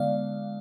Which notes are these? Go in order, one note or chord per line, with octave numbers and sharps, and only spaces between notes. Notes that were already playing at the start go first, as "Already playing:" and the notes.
Already playing: D3 G#3 B3 D5 F5